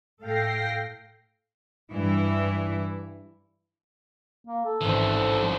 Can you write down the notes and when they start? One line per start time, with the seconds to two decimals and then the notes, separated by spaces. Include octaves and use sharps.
0.22 A2 A4 F5 G5 A#6 C7
1.91 G2 E3 E4
4.47 A#3
4.65 A4
4.81 A1 G#2 D#3 E3 C4
5.41 F3